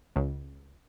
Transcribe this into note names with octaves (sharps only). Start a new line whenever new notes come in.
C#2